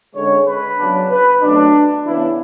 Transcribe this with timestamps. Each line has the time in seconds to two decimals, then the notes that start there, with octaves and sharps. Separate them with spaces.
0.14 D3 G#3 C#4 C#5
0.46 B4
0.78 C#3 F#3 B3 D4
1.09 B4
1.41 B2 F#3 A3 C#4 D4
2.04 C#3 E3 B3 D4 E4